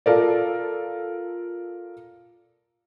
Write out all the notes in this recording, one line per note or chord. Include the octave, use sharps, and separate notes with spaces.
F4 A4 A#4 D5